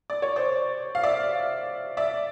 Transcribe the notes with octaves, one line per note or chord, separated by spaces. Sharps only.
D5
C#5
C5 D5
F5
D5 E5
D5 E5